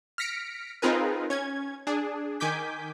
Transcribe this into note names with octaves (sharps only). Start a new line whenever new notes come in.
F6 A#6 B6 C#7 D7
C4 D#4 F4 G#4 A#4 B4
C#4 G#6
D4 G#4
D#3 G#5 D6 G6 B6